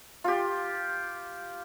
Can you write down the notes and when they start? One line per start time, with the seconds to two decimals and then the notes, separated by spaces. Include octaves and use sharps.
0.24 F4 G4